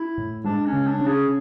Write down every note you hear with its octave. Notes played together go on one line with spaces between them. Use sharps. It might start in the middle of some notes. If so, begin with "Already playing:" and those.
Already playing: E4
A2
G#3 D4
C#4
C#3
D4
C#4
G#4